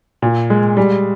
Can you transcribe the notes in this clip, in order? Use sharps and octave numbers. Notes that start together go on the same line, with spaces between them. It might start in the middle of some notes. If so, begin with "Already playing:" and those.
A#2
G#3
G3